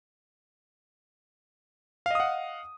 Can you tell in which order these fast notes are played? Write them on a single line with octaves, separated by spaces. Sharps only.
F5 D#5 D#6 F#5